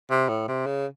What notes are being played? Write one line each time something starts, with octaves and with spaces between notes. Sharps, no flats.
C3
A2
C3
C#3